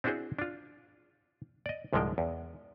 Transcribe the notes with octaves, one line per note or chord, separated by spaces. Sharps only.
C4 D4 E4 F#4 G#4 C5
D4 F4
D5 D#5
C2 G#2 D3 F3 G#3 G5
E2